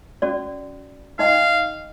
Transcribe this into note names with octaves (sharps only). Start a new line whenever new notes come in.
C#4 F#4 D5
D#4 D#5 F5 G5